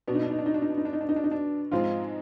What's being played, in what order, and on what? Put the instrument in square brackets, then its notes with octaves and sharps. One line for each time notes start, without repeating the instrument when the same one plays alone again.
[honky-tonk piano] B2 F#3 B3 [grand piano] D4
[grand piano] D#4
D4
D#4
D4
D#4
D4
D#4
D4
D#4
D4
D#4
D4
D#4
D4
D#4
D4
[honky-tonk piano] G#2 F3 G#3 C4 [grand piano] F4